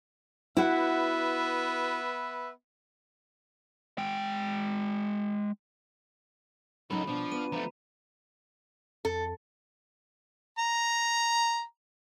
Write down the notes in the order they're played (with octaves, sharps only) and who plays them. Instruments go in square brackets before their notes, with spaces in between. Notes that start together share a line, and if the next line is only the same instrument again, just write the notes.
[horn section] B3 B4 E5 [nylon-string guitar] E4 F#4
[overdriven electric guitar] G#3 G5
[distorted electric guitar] C#2 A4 [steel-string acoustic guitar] F#2 F#3 [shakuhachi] D#4 [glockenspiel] B5
[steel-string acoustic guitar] B2 [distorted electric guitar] F3 [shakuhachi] D4
[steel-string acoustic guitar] B3 [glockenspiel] D#7
[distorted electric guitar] F3 A3 [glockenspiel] A#5
[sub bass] F2 [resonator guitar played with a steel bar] A4
[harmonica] A#5